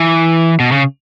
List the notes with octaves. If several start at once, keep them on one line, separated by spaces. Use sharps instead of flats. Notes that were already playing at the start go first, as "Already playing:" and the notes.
Already playing: E3
B2
C#3